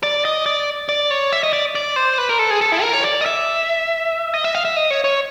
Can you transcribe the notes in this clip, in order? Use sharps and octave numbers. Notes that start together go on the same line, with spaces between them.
D5
D#5
D5
D5
C#5
E5
D#5
D5
D5
C5
B4
A#4
A4
G#4
A4
E4
A#4
C#5
D5
D#5
E5
D#5
E5
F5
E5
D#5
C#5
C#5